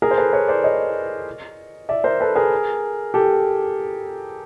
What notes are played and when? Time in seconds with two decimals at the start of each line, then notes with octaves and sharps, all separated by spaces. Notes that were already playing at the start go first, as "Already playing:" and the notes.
0.02 G#4 A#4
0.11 C5
0.18 A4 B4
0.33 B4 C#5
0.48 C5 D5
0.64 C#5 D#5
1.89 D5 E5
2.04 A#4 C5
2.20 A4 B4
2.35 G#4 A#4
3.14 G4 A4